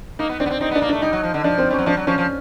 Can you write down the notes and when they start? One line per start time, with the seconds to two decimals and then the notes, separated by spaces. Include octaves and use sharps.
0.19 A#3 D#4
0.29 B3
0.40 C4 D4
0.46 B3
0.50 C4
0.61 C4 D#4
0.71 B3
0.75 D4
0.82 A#3
0.89 D4
0.93 A3
1.02 G3 D#4
1.13 F#3
1.23 F3
1.34 D3
1.44 F3 D4
1.58 C4
1.70 G3 C#4
1.79 F#3
1.86 F3 D4
1.97 F#3
2.07 F3 C#4
2.18 F3